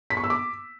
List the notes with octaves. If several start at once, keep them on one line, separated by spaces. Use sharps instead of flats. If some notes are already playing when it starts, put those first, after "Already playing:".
B6
C#6
E6
D6